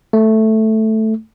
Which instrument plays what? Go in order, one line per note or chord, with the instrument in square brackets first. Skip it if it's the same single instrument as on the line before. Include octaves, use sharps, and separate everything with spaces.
[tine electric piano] A3